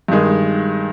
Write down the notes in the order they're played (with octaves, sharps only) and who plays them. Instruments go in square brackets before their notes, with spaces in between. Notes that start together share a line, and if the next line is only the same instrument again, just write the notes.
[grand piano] G2 D#3 G#3